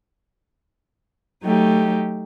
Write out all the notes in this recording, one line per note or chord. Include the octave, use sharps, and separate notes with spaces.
F#3 A3 D#4 G4